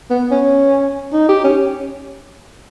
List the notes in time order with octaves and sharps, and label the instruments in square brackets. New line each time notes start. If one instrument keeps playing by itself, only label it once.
[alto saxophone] B3
C#4
D#4
G4
C#4